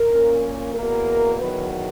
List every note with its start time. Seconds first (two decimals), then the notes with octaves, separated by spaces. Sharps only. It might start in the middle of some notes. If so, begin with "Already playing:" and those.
Already playing: A#4
0.11 A#2 A#3 C#4
0.75 E2 B2 A#3 A#4
1.40 E2 D#3 F#3 B3 B4